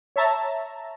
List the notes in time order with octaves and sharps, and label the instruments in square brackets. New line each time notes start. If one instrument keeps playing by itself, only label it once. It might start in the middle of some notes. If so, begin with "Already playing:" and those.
[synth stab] C#5 E5 A5 A#5